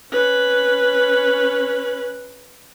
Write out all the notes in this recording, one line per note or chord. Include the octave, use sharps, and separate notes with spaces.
C#4 B4